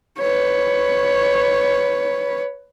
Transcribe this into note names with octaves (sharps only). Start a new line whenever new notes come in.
B4 C#5